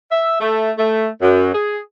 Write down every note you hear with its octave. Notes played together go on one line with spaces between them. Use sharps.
E5
A3
A3
F#2
G#4